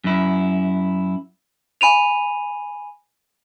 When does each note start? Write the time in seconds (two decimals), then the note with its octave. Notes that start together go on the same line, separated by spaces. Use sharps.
0.04 F#2 E4
1.81 G#5 B5 D#7 F7